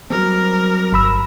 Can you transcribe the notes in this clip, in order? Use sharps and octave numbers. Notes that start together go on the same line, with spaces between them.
F#3 G3 C4 A#4
G1 B5 E6